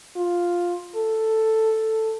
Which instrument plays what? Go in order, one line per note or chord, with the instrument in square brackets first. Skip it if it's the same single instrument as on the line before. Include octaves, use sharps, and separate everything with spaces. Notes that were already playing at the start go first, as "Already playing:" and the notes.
[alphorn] F4
A4